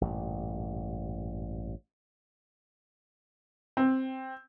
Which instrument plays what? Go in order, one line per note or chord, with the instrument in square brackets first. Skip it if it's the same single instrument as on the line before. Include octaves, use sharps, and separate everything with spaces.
[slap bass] A1 G2 A#2
[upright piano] C4